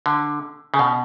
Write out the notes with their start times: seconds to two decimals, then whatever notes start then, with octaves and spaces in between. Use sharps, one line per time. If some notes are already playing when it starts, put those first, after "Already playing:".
0.06 D3
0.74 C#3
0.79 B2